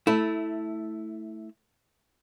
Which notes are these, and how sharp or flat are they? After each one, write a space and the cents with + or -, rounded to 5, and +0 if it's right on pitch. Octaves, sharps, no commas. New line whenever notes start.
A3 +0 E4 -15